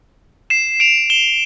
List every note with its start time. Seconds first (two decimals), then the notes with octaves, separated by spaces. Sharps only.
0.50 C7 E7
0.80 D7 F7
1.10 E7 G7